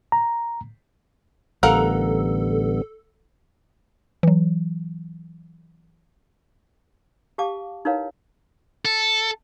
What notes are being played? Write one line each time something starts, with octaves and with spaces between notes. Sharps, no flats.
A#5
A1 D3 G3 B3 A4 A#4 F5 F#5
E3 F#3
G4 F5 A5 D6
D#4 E4 A#4 B4 C#5 F5
A4